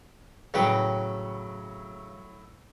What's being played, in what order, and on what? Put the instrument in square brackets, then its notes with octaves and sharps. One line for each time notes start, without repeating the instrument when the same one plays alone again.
[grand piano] A2 F#3 [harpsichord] C#3 B4 [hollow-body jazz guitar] C#5 F#5 G5